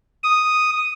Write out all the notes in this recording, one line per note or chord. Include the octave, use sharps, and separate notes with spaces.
D#6